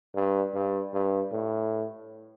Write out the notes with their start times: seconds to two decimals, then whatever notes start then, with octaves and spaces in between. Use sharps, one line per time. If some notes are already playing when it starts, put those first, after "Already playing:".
0.15 G2
0.54 G2
0.94 G2
1.32 A2